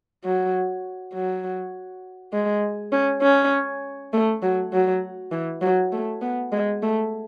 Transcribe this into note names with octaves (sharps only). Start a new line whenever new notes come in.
F#3
F#3
G#3
C#4
C#4
A3
F#3
F#3
E3
F#3
A3
B3
G#3
A3